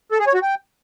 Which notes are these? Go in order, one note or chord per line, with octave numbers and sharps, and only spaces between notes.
A4
G#4
C#5
F#4
G5